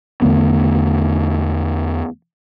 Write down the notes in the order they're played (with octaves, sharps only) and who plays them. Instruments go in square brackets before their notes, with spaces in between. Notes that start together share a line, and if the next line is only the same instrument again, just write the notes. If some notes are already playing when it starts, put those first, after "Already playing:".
[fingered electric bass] E2 D3 A3 B3